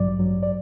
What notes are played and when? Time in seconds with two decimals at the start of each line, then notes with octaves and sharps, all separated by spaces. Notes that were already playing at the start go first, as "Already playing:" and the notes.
Already playing: A1 G2 F#3 D5
0.18 A1 G2 F#3
0.43 D5